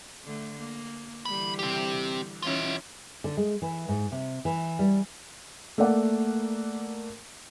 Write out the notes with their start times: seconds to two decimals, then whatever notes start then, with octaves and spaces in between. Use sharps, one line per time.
0.25 D3 A3
0.59 A#3
1.26 D3 E3 G3 B5
1.59 C4 G4
2.43 E3 C#4 D#4 F4 E5
3.24 D3
3.37 G#3
3.62 E3
3.88 G#2
4.12 C3
4.45 E3
4.79 G3
5.78 A3 A#3 A#4 D5 F#5